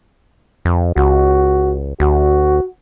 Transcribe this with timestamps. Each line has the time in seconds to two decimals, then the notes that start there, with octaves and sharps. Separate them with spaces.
0.65 F2
0.96 C#2 F#4
2.00 D2 F#4